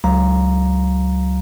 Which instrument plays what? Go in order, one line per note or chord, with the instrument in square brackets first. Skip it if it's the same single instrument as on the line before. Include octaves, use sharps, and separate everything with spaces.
[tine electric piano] C#2 F#3 F5 A#5